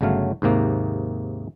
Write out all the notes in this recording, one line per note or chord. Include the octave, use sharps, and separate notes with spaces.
G1 C#3 F#3 A3 F5
D#2 G#2 C3 A#3